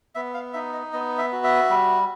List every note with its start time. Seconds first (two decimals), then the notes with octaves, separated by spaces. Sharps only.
0.15 B3 E5
0.34 F5
0.53 D#4 E5
0.73 D#5
0.93 B3 D#5
1.18 E5
1.32 F#4
1.44 E5
1.70 G3